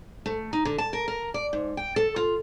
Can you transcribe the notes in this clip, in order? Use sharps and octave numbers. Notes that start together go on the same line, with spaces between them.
A3
D#4
D3
A5
A#4
A#4
D5
G#2
G5
A4
F4